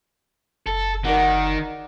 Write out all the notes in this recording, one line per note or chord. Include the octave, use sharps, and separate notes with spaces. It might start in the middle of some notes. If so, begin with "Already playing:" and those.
F#1 A4
D#3 A#4 D5 F#5